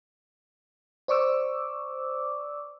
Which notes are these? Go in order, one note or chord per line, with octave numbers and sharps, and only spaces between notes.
C5 D5 C#6 D6 E6